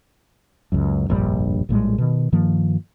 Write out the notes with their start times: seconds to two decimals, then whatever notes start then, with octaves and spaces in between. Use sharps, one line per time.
0.72 C#2 F#2
1.08 F1 A#1 G2 G3
1.69 A#1 A2 G3 G#3
1.98 B2 D#3
2.32 G2 D#3 F3 A#3